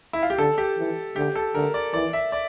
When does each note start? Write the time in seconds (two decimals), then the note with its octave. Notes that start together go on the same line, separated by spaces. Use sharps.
0.13 E4
0.22 F4
0.30 G4
0.38 D3 A4
0.58 G4
0.78 E3
1.16 D3 G4
1.36 A4
1.55 D3 A#4
1.74 D5
1.93 E3 D5
2.13 E5
2.32 D5